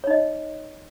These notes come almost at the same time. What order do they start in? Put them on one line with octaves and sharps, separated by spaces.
C#5 D#4 D#5